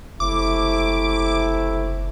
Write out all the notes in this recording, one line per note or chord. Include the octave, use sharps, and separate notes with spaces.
F#1 C3 A3 E4 D6